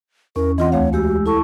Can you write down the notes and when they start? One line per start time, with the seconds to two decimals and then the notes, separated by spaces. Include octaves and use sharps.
0.36 E2 C#4 A#4
0.58 E3 C4 F4 D#5 F#5 C6
0.72 D2 A3 C#5 F5
0.93 G#3 F#4 G4 E6
1.26 E4 A4 A5 C#6